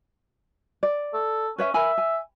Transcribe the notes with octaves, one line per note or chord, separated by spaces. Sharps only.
D5
A4
C#4 B4 C#5 E5
A#4 E5 G#5 B5
G#5